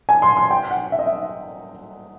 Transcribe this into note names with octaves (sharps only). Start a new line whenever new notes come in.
G#5
C6
C6
G5
F#5
E5
D#5
E5